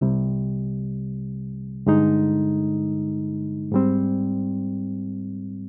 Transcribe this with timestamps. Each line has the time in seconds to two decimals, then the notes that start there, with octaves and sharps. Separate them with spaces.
0.01 C2 C3 G3
1.86 G2 D3 G#3 D#4
3.72 G#2 G3 C4